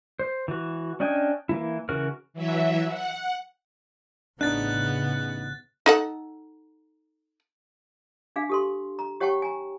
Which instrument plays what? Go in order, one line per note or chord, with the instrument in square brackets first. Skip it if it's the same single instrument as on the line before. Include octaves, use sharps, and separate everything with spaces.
[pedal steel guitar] C5
E3 F#4
C#4 D4 D#5 G5 G#5
E3 A#3 E4
C#3 E3 F#4 A#4 F6
[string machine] E3 F#3 E5
F#5
[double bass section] A1 C#3 [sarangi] B3 [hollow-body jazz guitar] D4 D#4 [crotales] F#6 A6
[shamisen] D#4 A4 F#5
[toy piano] D4 G#4 F5
G4 A4 C6
A#5
G4 C#5 F#5 G5 A5 C#6
G#5 A#5